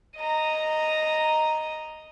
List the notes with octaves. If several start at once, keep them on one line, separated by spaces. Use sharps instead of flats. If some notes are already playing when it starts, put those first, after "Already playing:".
D#5 A#5